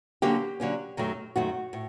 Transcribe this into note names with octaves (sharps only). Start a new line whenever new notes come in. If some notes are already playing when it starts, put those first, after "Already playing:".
D3 F#3 A#3 C#4 G4
D3 F#3 A#3 C#4
F#2 D#3 F#3 A3
F#2 D#3 F#3 A3 F#4
A2